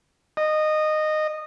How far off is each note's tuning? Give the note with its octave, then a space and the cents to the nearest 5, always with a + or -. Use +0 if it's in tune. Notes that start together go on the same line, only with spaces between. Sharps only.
D#5 -15